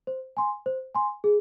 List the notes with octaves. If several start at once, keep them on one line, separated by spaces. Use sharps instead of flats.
C5
G#5 C6
C5
G#5 C6
G#4